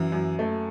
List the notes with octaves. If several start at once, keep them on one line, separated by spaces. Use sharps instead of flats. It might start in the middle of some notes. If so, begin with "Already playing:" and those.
Already playing: F#2 E3
F#2
A3